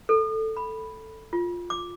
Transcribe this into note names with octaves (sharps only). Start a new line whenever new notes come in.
A4
B5
F4
D6